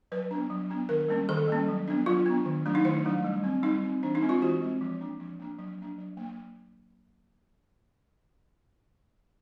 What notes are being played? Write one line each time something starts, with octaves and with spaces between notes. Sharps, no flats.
F#3 B4
B3 D4
F#3
B3 D4
D#3 A#4
G3 A#3 C#4
D#3 A4
G3 A#3 C#4
F#3
B3 D4
F#3 F4
B3 D4
D#3
F#3 A3 D4
D#4
D#3 E4
F#3 A3 D4
G3
C4
G3 D#4
C4
E3 D4
D#4
G#3 C4
F4
E3 F#4
G#3 C4
F3
A#3 D4
F3
A#3 D4
F#3
A#3 D4
F#3
A#3